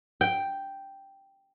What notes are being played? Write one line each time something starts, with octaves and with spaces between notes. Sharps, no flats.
G5